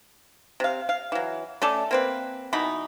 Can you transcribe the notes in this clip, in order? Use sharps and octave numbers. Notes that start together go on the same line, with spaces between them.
C3 F5
F5
E3 F#3
A3 C#4 A4 D5
A#3 C4 B4
B2 E3 D#4 B5